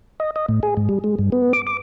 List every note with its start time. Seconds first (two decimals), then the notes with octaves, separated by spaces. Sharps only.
0.20 D#5
0.36 D#5
0.49 A2
0.63 G#4
0.77 G#2
0.89 G3
1.04 G#3
1.19 G2
1.32 B3
1.53 D6
1.67 D6